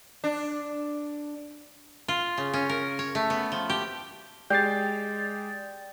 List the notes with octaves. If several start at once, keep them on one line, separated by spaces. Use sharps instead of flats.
D4
F4
C#3
C#4
A#4
C#5
A3
B3
F3
G4
G#3 G4 D5 G5 A6 C7